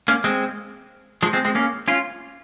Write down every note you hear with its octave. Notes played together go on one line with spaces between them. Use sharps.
A#3 C#4
G#3 C4
F3 G#3
G#3 C4
G#3 C4
A#3 C#4
C#4 F4